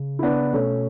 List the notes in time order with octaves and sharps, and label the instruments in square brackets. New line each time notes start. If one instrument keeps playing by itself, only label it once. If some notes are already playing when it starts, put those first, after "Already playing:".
Already playing: [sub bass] C#3
[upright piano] E4
B3 D4
[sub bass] B2 [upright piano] A3 C#4